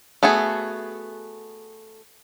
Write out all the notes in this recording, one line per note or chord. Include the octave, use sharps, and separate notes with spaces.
A3 B3 F#4 G#4